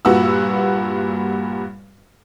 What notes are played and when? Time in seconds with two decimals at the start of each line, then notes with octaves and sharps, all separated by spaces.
0.05 G2 A#2 F#4 B4 E6